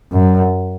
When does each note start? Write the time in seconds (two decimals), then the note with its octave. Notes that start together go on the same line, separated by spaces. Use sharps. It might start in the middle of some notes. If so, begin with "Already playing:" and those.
0.12 F#2